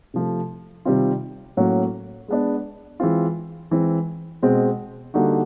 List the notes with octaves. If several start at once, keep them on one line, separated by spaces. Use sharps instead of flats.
C3 F3 A3
C3 D#3 G3 C4 F4
A2 F#3 A#3 C#4
G#3 B3 D4
E3 G#3 C4 F4
E3 G#3 C4
B2 G#3 C4
D3 G3 A#3 D#4 F#4